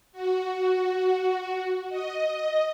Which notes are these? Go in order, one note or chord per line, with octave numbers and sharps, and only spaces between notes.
F#4
D#5